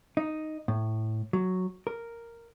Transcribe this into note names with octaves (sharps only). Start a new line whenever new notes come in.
D#4
A2
F#3
A#4